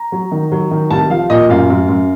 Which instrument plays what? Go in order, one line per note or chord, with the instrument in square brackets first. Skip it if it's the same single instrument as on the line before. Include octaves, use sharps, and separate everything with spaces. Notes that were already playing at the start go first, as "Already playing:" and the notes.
Already playing: [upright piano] A#5
F#3
D#3
F#3
D#3
C2 A5
F3 F5
A#2 D#5
F#2 F5
F#2
F#2